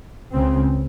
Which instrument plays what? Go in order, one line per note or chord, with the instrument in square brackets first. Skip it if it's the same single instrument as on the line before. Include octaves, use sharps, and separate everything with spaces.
[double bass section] C#2 C#3 C4